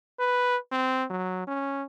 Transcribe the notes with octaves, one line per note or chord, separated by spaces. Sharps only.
B4
C4
F#3
C#4